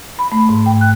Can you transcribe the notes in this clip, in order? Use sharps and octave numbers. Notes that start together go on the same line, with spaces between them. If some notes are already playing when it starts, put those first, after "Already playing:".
B5
A3
G#2
G5
F#6